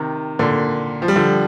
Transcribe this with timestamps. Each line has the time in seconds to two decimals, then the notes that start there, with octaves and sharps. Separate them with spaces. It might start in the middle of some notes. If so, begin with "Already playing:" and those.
Already playing: C3 D#3
0.39 A#2 D3
1.02 F3
1.08 G3
1.16 D3 F3